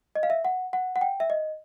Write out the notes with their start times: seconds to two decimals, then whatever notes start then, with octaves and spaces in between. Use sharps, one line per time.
0.15 D#5
0.23 F5
0.30 E5
0.45 F#5
0.73 F#5
0.96 F#5
1.01 G5
1.20 E5
1.30 D#5